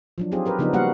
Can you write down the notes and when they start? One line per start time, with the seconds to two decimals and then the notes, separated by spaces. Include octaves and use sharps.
0.18 F3 F#3 D4
0.32 F#3 C4 D#4 F4 G4 G#4
0.46 G4 A#4 B4
0.59 C#3 F3 B3 D4 D#4
0.73 G3 A#3 B3 F#4 F5 F#5